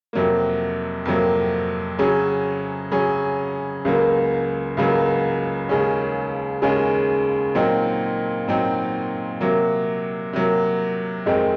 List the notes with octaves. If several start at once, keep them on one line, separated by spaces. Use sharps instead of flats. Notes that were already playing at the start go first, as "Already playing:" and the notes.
F2 C3 F#3 A#3
F2 C3 F#3 A#3
C#3 F#3 C#4 G#4
C#3 F#3 C#4 G#4
C#2 C#3 F#3 A#3
C#2 C#3 F#3 A#3
D#2 C#3 G#3 C#4
D#2 C#3 G#3 C#4
A#2 F#3 C4 D#4
A#2 F#3 C4 D#4
C3 F#3 A#3
C3 F#3 A#3
F2 D#3 G#3 C4 D#4